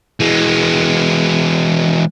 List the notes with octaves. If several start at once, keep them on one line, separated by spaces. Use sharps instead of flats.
E3 G#3